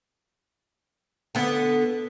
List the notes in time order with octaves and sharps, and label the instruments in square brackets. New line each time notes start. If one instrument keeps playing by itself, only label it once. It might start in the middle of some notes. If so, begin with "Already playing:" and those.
[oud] D3 B3